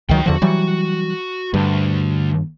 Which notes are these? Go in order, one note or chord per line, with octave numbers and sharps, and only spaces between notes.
C#2 D#3 F#3 C#5 G5
E2 D3 F3 F#4
E3 F#3 G3
D2 G2